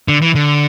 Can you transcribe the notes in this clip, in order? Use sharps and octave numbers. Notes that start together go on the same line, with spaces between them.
D3
E3
D3